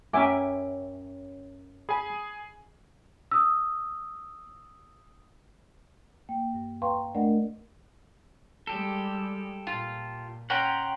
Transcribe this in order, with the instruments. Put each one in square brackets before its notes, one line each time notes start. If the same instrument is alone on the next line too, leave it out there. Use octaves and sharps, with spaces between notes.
[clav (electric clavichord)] F#2 [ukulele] C#4 G5 [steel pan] E5 G#5 D6
[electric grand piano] G#4 G#5 [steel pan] B5
[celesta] D#6 E6
[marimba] A#3 G5
G2
B4 F5 G5 A#5 C6 C#6
A3 D4 A#4 D5 D#5 F#5
[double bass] G3 G#3 [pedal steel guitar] G4 A4
[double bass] A#2 [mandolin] F4
[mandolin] C#4 G5 F#6 [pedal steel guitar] F#5 A#5 C6